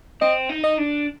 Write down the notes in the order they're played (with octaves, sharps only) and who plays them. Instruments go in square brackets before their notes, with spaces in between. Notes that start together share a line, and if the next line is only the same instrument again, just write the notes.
[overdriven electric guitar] C4 [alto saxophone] D#5
[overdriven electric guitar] D#4
[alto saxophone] D#5
[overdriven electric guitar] D4